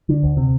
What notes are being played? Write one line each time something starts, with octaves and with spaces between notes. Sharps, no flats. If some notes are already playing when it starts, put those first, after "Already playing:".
D3
D2
C3